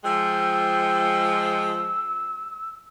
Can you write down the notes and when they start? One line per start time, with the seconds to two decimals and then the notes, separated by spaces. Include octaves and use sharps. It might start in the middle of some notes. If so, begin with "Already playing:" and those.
0.04 F3 G#3 G5 E6